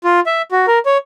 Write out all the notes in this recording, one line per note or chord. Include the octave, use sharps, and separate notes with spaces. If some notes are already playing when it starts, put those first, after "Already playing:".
F4
E5
F#4
A#4
C#5